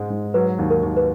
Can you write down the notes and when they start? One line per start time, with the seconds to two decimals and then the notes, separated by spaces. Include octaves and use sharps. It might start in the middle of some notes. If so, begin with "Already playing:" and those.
Already playing: G#2 G#3
0.10 G#2
0.34 F#3 B4
0.59 D#2
0.70 A#4
0.83 D#2
0.97 B4